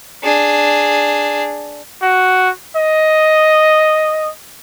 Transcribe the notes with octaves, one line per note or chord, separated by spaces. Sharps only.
D4 G#4
F#4
D#5